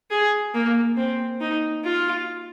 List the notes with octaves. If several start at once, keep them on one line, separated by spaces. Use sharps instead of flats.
G#4
A#3
C4
D#4
F4